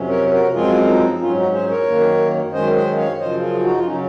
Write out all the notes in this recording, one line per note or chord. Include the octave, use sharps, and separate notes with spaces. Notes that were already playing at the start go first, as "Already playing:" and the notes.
Already playing: F2 C3 F#3 C#4
A#4 C#5
F#4 A#4
F#2 F3 G#3 C4 F4 G#4
D#4
G#2 F#3 C#4 F4
D#4 F#4
G#4 C5
A#4 C#5
F#2 D#3 A#3
F#2 D#3 G#3 C#4 C5 D#5
C5 D#5
C#5 F5
F#2 C#3 F3 C5 D#5
F4 G#4
G#4
D#4 F#4
F4
C#3 F#3 C#4 D#4